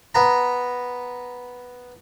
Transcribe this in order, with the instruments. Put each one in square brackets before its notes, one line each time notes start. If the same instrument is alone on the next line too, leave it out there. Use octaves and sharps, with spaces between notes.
[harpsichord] B3 A#5